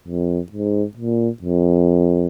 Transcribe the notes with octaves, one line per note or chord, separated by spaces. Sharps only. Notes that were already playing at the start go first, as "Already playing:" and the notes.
F2
G#2
A#2
F2